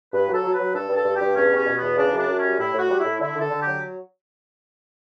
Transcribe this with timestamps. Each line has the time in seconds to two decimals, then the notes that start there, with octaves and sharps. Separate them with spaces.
0.13 G2 B4
0.28 F#3
0.33 A4
0.44 F#3
0.54 B4
0.59 F#3
0.74 G2 A4
0.89 G2
0.95 A4
1.05 G2
1.15 G4
1.21 G2
1.36 E2 C#4
1.51 G3 C#4
1.66 B2
1.77 E2 B3
1.97 C#3 D4
2.12 F#2
2.18 D4
2.28 F#2
2.38 C#4
2.43 G3
2.59 A2 E4
2.74 A2
2.79 F#4
2.89 G3
2.99 E4
3.05 A2
3.20 D3 E4
3.35 D3
3.40 A4
3.50 D3
3.61 F#3 G4